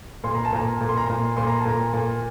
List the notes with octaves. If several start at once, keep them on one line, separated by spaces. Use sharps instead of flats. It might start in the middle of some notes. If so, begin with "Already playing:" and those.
A#2 C6
A#5
A5
A#2 A#5
A#2
C6
A#5
A#2 C6
A#2 C6
A#5
A5
A#2 A#5
A#2